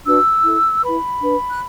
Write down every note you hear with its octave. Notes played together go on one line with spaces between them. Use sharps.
D4 F#4 B4 E6
E4 A4
E4 B4 B5
D4 B4
F#6